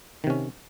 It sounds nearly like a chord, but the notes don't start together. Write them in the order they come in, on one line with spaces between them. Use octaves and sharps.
D#3 C3 C#4